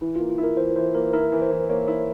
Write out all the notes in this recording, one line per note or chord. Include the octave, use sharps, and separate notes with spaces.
E3 E4
A#3 F4
F4
E4
A#4
E3 C5
E3 C5
A#3 A#4
E4 A#4
E3
C5
E3
A#3 C#5
E4